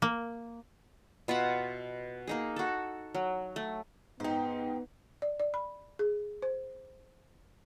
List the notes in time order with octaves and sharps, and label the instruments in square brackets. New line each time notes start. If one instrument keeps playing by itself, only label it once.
[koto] A#3
[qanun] B2 F4 E5 F#5
A#3 D#4 G#4
F#4 A4
F#3
A3
[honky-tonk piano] G#2 D#4 [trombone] B3 [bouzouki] G4 C5
[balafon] D5
D5
B5
G#4
C5